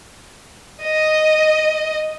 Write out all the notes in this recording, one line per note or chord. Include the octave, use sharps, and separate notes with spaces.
D#5